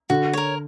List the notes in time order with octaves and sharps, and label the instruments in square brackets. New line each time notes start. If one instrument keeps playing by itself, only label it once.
[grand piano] D3 [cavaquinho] F#4
[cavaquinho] A#4 C#5